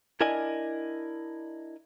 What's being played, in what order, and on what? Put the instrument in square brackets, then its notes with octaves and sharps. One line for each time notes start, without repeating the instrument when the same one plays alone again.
[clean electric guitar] D4 E4 A#4 D5 D#5 G#5